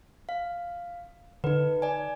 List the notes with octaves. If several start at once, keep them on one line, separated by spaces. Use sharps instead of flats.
F5
D3 D#4 B4
D5 G#5